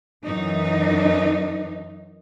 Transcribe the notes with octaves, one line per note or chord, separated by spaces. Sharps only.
F#2 E3 D#4